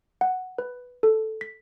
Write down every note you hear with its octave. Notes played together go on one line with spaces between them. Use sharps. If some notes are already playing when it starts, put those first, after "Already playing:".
F#5
B4
A4
B6